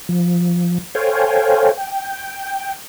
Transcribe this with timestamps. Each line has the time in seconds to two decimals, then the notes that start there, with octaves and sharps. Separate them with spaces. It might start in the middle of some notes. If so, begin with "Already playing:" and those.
0.09 F3
0.95 A4 C5 C#5 F5 G5 G#5
1.77 G5